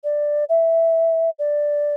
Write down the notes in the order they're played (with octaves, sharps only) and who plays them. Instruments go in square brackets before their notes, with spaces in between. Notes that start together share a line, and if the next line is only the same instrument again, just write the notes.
[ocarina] D5
E5
D5